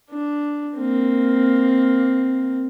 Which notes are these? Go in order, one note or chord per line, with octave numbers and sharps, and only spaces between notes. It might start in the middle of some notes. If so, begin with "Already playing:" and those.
D4
A#3 C4